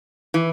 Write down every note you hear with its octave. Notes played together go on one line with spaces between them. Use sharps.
E3